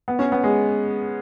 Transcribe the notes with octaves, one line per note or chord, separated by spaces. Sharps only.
B3
C#4
B3
G#3